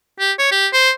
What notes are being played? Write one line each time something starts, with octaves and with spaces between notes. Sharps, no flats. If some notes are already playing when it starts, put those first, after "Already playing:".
G4
C#5
G4
C5